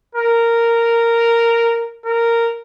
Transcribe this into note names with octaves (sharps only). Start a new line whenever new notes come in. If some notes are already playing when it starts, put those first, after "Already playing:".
A#4
A#4